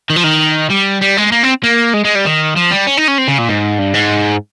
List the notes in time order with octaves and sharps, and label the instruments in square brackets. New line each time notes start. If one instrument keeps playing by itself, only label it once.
[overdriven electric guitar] D#3
F3
D#3
G3
G3
G#3
A#3
C4
A#3
G#3
G#3
G3
D#3
F3
G3
C#4
D#4
C#4
C4
C#3
A#2
G#2
G2
G#2